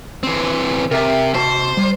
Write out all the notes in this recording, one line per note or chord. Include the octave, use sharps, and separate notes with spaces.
E3 C4
C3 A#4 E5
C3 F#4 C5 A5
G3